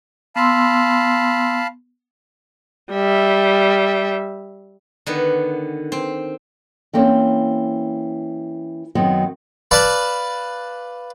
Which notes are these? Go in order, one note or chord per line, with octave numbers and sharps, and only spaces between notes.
B3 F5 A5 B5 C6 E6
G3 E5
D3 D#3 B3
C4
E3 A#3 C4 C#4
F#2 D#3 F#3 B3 C4
B4 D5 F5 A5